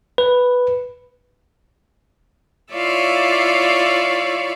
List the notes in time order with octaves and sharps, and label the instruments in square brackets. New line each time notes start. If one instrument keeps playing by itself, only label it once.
[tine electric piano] B4
[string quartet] E4 F4 C#5 D5 E5 F5